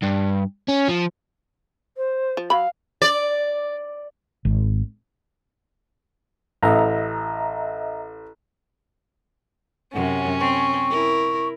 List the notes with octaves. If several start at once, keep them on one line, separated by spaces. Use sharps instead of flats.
G2
C#4
F3
C5
F3
F#3 F5 B5
D5
G#1
A1 D#5 E5 A#5
F#2 C3 C#4 F#5
C4 C#6
E4 A#4